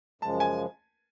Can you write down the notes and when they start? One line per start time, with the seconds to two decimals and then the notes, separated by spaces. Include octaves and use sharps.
0.22 F#2 C#3 F3 G#3 A5
0.40 G#5